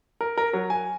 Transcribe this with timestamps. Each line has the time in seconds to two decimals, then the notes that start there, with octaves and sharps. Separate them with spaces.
0.21 A#4
0.38 A#4
0.53 F#3
0.70 G#5